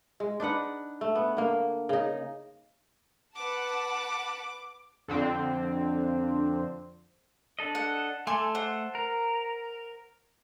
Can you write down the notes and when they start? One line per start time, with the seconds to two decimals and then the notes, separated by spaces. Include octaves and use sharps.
0.20 G#3
0.40 D4 D#4 B4 F#5
1.01 A3
1.15 B3
1.37 D3 A#3
1.89 C#3 D#4
3.35 B4 F#5 A5 D6
5.08 F2 D3 C4
7.59 D4 A4 D#5
7.75 F#5
8.27 A3 A4 G#5 C6 D6
8.55 C5 F#5
8.95 A#4